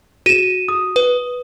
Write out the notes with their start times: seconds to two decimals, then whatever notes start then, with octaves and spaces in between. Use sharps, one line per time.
0.26 F#4 D#7 E7
0.68 D#6
0.96 B4